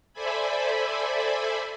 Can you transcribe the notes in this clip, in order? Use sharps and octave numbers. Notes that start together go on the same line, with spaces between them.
A4 C5 D5 E5 G#5 B5